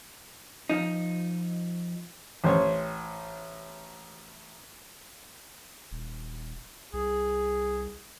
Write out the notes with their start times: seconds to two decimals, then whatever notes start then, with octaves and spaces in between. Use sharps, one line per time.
0.69 F3 D#4
2.44 A1 C5 C#5
5.91 D#1
6.93 C2 G#4